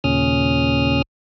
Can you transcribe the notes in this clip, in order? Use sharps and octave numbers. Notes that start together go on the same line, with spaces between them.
D#2 A#2 C#3 C#4 D#6 F6